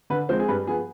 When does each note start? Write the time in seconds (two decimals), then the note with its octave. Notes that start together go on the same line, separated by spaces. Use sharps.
0.10 D3 B4
0.29 F3 G#3 C4 C5
0.40 G#4
0.48 G2 B4
0.67 F3 B3 G#4